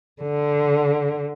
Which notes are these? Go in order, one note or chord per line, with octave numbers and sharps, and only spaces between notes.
D3